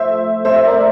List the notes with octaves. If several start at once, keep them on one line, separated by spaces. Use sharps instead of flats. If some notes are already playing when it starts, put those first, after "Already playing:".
Already playing: A2 F3 A3 C5 E5
C5 E5
C5 E5
A#4 D5